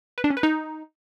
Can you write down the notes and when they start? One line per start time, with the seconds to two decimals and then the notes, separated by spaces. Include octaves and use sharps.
0.18 B4
0.24 D4
0.30 C#4
0.37 B4
0.43 D#4